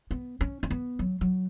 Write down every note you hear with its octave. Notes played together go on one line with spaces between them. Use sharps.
B3
C#4
C#4
B3
F#3
F#3